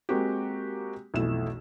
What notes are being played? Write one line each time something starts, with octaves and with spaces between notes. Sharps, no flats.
G#3 A#3 C4 F#4 G4
B1 F2 E3 A3 E4 E7